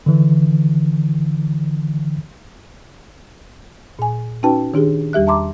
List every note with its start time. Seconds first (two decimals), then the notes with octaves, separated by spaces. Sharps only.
0.06 D3 E3
3.99 A#2 G#5
4.43 C#4 D#4 F#4 B4 G5 A5
4.74 D#3 D4 G4 G#4
5.13 E2 G3 G4 E5 F#6
5.27 E5 A5 A#5 C6 D6